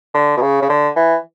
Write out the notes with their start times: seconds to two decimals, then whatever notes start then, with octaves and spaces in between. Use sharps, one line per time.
0.14 D3
0.37 B2
0.41 C#3
0.62 C#3
0.69 D3
0.96 E3